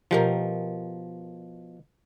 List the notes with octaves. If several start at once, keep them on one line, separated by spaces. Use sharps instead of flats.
B2 F3 G4 A#4